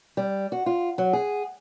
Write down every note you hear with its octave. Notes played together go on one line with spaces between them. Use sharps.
G3
F#4
F4
F#3
G#4